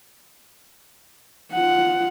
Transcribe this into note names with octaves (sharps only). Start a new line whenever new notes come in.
F4 F#5